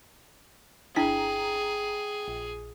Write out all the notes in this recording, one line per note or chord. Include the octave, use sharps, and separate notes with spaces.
G1 D4 E4 G#4 G5 A#5 B6
A#1